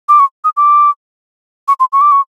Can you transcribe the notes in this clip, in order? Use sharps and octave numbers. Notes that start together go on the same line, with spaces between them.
D6
C#6
D#6
D6
C#6
C6
C#6
D6
C#6